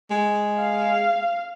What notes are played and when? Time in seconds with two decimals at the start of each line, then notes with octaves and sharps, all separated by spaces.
0.11 G#3
0.59 F5